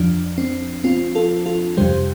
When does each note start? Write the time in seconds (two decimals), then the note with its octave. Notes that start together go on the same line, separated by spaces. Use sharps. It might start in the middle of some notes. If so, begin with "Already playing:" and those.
Already playing: F2 F3 D4
0.38 C4
0.84 C4 F4
1.15 F4 A4
1.46 F4 A4
1.77 F2 C3 G3 G4 C5